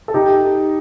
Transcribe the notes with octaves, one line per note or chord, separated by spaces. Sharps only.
A4
D#4 G4